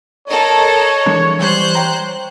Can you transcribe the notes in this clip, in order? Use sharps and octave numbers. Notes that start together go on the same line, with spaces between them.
A4 A#4 C#5 D#5
E3 G#3 D4
E3 G3 C5 F#6 G6
C#5 G5 A#5